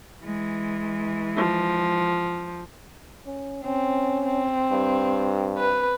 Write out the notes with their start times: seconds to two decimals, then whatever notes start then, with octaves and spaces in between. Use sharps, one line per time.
0.23 E3 G#3
1.36 F3
3.26 C#4
3.65 C4 C#4
4.26 C4
4.72 G2
5.58 B4